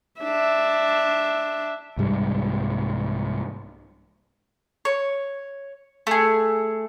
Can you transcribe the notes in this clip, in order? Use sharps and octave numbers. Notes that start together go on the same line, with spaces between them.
D4 E5
C2 G#2 G3
C#5
A3 G#4